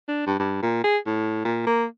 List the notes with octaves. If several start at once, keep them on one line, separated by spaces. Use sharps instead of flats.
D4
G2
G2
A#2
G#4
A2
A#2
A#3